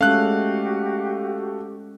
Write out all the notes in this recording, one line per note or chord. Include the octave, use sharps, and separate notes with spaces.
G#3 A3 C#4 F#4 G4 F5 F#6